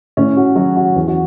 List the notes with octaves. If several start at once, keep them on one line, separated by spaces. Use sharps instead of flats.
A2 C#4
F#4
F#3 F#4
F#4
E2
F#4